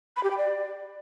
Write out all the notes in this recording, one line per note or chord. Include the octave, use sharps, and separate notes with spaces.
B5
G4
G5
D5